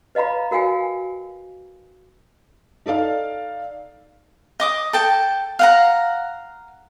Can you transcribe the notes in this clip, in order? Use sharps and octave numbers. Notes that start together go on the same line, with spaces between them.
B4 D#5 F5 A#5 B5
F#4 A#4 F5 G5 G#5
D#4 A4 D5 F5
D#5 D6 D#6
A4 G5 A5
F5 F#5 A#5